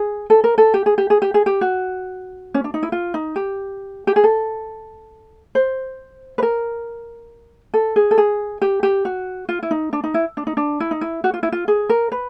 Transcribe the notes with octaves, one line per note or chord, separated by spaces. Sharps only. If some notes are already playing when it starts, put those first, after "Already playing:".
Already playing: G#4
A4
A#4
A4
G4
G#4
G4
G#4
G4
G#4
G4
F#4
C#4
D4
D#4
E4
F4
D#4
G4
G4
G#4
A4
C5
B4
A#4
A4
G#4
A4
G#4
G4
G4
F#4
F4
E4
D#4
D4
D#4
E4
D4
D#4
D4
E4
D#4
E4
F#4
F4
E4
F4
G#4
A#4
B4